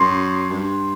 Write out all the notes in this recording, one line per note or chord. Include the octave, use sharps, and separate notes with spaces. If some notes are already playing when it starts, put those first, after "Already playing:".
Already playing: F#2 C6
G2